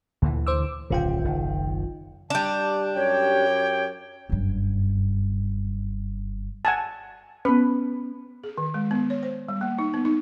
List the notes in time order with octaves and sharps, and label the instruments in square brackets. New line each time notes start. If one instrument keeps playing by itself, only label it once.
[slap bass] D2 D3 E3 [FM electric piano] A#2
[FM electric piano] C5 D6 E6
[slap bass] D1 C#3 [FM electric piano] B1 F4 G5
[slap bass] F#1 D#3
[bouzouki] G3 D4 [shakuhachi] A5
[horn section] F#2 G4 G5 [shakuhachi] C#5
[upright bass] F#1 G2
[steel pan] F#5 G#5 A5
[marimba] B3 C#4 [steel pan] B4
[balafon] G#4
D#3
G#3
B3
C#5
C5
G3
A#3
D#4
B3
D#4